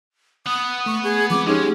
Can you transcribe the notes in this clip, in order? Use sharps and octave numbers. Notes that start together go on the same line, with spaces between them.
B4 F#5 D#6
A3 C#6
G#4
F3 G#3 C4 D6
G#3 C#4 D#4 G4 G#4